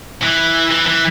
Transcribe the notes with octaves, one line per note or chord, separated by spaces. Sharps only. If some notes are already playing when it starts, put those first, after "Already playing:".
E3
E3
E3